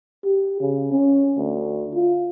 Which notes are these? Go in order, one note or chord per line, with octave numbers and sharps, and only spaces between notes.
G4
C#3
C#4
D2
F4